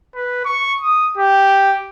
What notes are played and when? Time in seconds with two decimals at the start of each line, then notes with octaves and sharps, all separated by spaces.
0.14 B4
0.45 C#6
0.81 D#6
1.18 G4